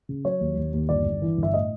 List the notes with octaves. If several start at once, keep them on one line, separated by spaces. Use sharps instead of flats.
C#3
F#3 C#5
D#2
D#2
D#2
G1 D5
G1
E3
G1
E5
A2 D#5